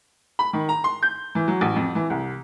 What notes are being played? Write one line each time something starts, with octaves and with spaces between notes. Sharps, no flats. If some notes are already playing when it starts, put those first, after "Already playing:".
B5
D#3
A#5
C6
G6
E3
F#3
A1
F2
E3
C2